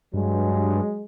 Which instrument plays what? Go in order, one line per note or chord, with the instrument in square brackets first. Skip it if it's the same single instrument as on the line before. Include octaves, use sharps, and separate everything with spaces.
[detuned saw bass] G2 [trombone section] F#3 G#3